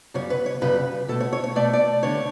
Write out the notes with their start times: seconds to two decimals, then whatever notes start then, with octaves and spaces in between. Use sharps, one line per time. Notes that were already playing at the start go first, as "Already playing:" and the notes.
0.14 F#2 C#3 G3 C#5
0.30 B4
0.46 C#5
0.61 F#2 C#3 G3 B4
1.08 B2 A3 A4
1.20 C#5
1.33 C#5
1.44 C#5
1.55 B2 A3 D5
1.73 D5
2.02 D3 G3 C#5